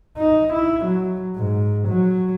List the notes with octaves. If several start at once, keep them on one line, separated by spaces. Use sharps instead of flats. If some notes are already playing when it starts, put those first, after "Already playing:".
D#4
E4
F#3
G#2
F#3